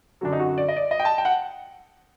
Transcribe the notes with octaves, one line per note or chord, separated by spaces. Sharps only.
F#2 D3 F#3 D4
D#4
F#4
D5
D#5
D5
D#5
G5
A5
G5
F#5